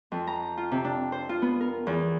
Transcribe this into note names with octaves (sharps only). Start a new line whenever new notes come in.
F2
A#5
F4
C3
D4
C5
F4
B3
A#4
E2